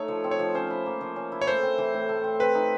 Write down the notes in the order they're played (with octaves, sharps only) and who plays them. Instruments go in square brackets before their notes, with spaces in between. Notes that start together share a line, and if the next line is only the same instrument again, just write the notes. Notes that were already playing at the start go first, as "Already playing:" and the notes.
Already playing: [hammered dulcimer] A3 D#4 [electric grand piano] C#5
[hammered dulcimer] F3
C4
[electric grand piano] C#5
[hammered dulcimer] F3
[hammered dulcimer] C#4 [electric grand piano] C5
[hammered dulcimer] E4
A#3
F3
C#4
E4
[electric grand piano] C#5
[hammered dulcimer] A3 [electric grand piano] C5
[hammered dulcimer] C4
E3
A2
A3
C4
[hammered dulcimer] C4 [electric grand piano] B4
[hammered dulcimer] D#4